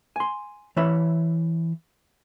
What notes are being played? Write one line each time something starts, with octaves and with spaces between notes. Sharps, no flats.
G#5 C6
E3 C#5 E5 B5